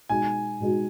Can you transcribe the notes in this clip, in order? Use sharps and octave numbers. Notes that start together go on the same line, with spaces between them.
B2 G#3 D#4 F#4 G#5
B2 G#3 D#4 F#4